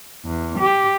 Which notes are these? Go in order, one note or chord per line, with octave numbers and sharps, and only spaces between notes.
E2
G4